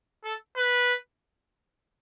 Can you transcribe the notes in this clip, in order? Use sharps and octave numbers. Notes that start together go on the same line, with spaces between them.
A4
B4